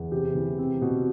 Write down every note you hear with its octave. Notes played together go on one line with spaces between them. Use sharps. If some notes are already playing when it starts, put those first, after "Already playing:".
Already playing: E2
C3 G4
E3
C4
B2